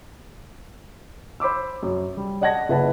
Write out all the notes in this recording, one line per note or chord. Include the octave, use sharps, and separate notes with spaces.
C5 B5 D6 E6
F#2
G3
D5 D#5 F#5 A5 G#6 A#6
F#1 E4 B4 F#5 A5